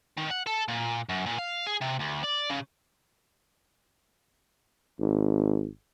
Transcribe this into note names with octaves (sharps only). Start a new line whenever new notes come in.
D#3
F#5
A4
A#2
F#2
A#2
F5
G#4
C3
D2
D5
C#3
G#1